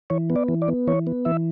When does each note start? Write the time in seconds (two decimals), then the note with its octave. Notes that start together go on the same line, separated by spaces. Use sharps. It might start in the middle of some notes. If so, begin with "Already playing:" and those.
0.10 E3 C#5
0.30 B3
0.36 D5
0.48 E3
0.62 D5
0.68 B3
0.87 E3 C#5
1.07 B3
1.25 E3 E5